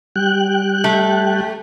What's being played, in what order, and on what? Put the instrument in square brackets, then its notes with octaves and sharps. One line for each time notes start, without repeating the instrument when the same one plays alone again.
[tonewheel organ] G3 G5 F#6
[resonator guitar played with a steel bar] A3